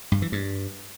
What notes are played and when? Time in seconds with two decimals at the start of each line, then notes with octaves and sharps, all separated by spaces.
0.12 G2
0.22 E3
0.32 G2